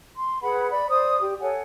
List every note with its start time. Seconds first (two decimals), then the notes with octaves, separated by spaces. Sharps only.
0.16 C6
0.42 G#4 B4 F#5 B5
0.70 D5 B5
0.88 C5 D5 D#6
1.21 G4
1.41 A4 C#5 F#5 G#5